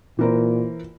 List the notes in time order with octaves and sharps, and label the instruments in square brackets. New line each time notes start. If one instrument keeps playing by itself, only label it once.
[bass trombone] A#2 [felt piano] E3 A#4 C5